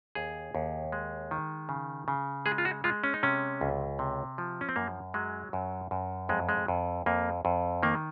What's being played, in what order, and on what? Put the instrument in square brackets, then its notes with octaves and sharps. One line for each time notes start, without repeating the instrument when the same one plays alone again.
[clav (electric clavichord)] D#2 G#4
D#2
G#3
D#3
C#3
C#3
G#3 G#4
F4
F#4
G#3 F4
C#4
D#4
C3 C#4
C#2
C3
F3
C#4
C4
F#2 A#3
F#3 G#3
F#2
F#2
F2 G#3
G#3
F2
F2 A#3
F2
D#3 A#3